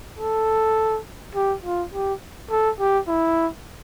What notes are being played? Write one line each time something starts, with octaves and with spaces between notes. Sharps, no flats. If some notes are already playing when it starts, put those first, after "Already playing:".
A4
G4
F4
G4
A4
G4
E4